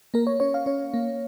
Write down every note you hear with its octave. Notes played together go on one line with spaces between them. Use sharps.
A#3 A#4
C#5
C#4 C#5
F5
C#4 C#5
A#3